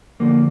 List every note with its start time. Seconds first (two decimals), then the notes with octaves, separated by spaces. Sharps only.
0.20 F2 D3 F3 A#3